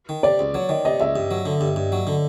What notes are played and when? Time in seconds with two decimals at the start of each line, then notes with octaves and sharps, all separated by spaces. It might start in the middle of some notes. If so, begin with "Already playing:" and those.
0.09 D#3
0.23 C3 D5
0.39 C#2
0.54 F#3 C#5
0.69 D#3 D#5
0.85 C3 D#5
1.00 C#2 E5
1.16 G2
1.31 F#3
1.46 D3
1.61 G2
1.76 G2
1.92 F#3
2.07 D3